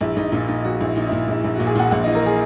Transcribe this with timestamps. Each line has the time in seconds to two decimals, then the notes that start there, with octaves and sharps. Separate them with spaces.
0.01 A#1 E4
0.16 A#1 D#4
0.32 A#2 D#4
0.48 A#2 D#4
0.65 A#1 F#4
0.80 A#1 E4
0.96 A#2 D#4
1.08 E4
1.12 A#2
1.28 A#1 E4
1.44 A#1
1.56 F#4
1.60 A#2
1.67 G#4
1.75 A#2 F#5
1.91 A#1 F#5
2.04 D#5
2.06 E3
2.15 A#4
2.26 G#4